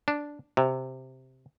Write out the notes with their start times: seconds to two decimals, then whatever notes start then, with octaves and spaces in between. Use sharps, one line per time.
0.08 D4
0.57 C3